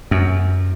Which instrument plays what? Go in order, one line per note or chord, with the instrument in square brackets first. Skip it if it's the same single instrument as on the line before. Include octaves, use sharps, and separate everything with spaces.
[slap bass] F#2